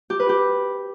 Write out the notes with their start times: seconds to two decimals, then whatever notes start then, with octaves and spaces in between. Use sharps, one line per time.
0.10 G4
0.20 B4
0.29 G4